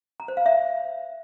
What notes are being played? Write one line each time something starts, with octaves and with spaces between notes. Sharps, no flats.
A#5
C5
F5
E5